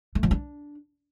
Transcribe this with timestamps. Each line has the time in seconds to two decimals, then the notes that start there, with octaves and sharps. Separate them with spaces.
0.15 A3
0.23 F3
0.31 D4